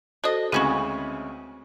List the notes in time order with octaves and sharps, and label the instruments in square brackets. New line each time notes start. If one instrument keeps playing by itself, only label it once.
[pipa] D4 D#5 [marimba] F#4 A4 C5
[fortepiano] D2 C#3 G#3 [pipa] E3 C#4 F#4 [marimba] C4 C#5